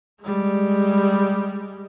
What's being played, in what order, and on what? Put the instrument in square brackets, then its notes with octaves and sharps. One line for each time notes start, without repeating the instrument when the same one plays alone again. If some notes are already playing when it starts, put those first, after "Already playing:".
[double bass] G3 G#3